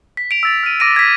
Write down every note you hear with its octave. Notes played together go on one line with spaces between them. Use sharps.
B6
D7 F7
E6 A6 F7
F6 D#7
D6 A#6 D7 D#7
G#6 B6